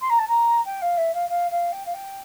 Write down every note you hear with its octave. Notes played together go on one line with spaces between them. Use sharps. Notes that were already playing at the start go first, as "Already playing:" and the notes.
C6
A#5
A5
A#5
G5
F5
E5
F5
F5
F5
G5
F5
G5